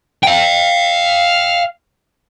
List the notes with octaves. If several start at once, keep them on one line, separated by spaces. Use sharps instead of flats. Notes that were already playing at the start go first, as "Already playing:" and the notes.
F5 G5